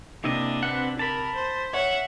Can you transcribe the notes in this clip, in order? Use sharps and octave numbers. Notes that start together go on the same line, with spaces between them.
C3 A#3 D4 E4 D#5
C4 B4 F#5
A#4 A5 B5
C5
C#5 E5 F#5